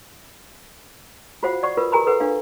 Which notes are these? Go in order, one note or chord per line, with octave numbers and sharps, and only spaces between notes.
F4 F#4 C5 F5 F#5
D5 F#5 C#6
F4 A#4 B4
G4 A#4 G#5 A#5 B5
A4 B4 F#5
D4 F5